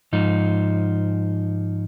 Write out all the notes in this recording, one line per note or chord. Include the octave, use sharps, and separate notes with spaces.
G#2 F3 D#4